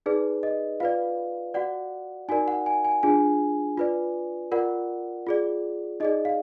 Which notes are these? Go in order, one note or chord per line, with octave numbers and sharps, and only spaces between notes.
D#4 G#4 B4 D5
D#5
F4 B4 D5 F5
F#4 D5 F#5
D#4 F#4 A#4 D5 G#5
F#5
G#5
G#5
D4 F4 G#4 G#5
F4 B4 D5
F4 A#4 D5 F#5
F4 G#4 D5
D#4 G#4 D5 D#5
F5